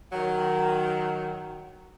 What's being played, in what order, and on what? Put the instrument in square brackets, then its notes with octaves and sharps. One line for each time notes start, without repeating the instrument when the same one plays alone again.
[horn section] D#3 F#3